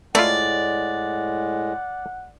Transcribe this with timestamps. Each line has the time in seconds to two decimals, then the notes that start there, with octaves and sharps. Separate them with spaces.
0.15 A2 G#3 A3 E4 F4 D5 F#5